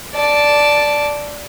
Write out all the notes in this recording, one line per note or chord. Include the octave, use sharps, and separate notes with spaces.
D5 A5